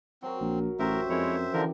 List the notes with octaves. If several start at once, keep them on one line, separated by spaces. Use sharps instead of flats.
F#3 C4 A#4
A#1
A1 F#2 G4 A#4 C5 E5 A#5
F2 G#3 E4 C#5
D3 E3 F3 A#4